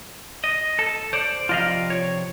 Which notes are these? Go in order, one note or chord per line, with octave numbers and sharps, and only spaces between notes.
D#5
A4
C5 D5
C3 F3 F4 D5 D#5 F5
C#5